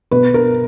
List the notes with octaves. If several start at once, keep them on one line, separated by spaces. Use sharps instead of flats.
B2 B4
A#4